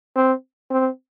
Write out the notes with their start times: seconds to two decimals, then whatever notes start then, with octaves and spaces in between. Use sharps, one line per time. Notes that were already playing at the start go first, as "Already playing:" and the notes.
0.16 C4
0.71 C4